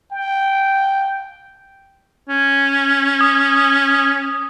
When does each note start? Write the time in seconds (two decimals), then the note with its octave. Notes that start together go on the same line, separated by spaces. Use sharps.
0.12 G5
2.29 C#4
3.21 D#6